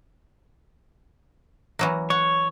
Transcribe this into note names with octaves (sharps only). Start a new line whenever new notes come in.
E3 F#3 A#3
C#5 F#5